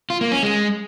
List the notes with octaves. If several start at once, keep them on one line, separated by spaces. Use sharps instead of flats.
F4
A#3
C#4
G#3